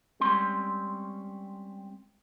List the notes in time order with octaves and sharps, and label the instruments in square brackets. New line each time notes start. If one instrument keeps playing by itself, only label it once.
[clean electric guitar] G3 G#3 C4 C#4 C6